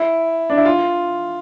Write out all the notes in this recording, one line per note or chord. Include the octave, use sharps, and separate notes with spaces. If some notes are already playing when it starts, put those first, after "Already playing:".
Already playing: E4
D4
E4
F4